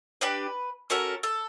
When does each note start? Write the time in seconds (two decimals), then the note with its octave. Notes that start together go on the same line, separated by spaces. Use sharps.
0.21 D4 G4 B4
0.90 C#4 F#4 A4 A#4
1.23 A4